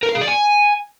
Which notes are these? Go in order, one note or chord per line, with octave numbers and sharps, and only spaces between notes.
A#4
F5
G#4
D5
G#5